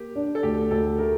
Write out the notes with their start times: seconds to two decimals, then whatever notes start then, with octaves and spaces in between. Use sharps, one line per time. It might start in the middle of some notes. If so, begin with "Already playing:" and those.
Already playing: A#3 G4
0.16 D4
0.35 A4
0.43 D2 G4
0.71 D2 A4
0.98 A3 A#4